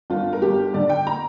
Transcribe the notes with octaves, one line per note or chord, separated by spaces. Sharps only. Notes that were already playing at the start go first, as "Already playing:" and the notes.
G1 F4
A#4
G1 G4
D3 D5
G5
A#5